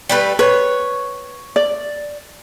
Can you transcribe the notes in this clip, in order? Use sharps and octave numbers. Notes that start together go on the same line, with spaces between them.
G3 A3 B4
B4 C#5
D5